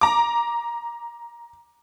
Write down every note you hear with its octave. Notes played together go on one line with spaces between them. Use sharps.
A#5 D6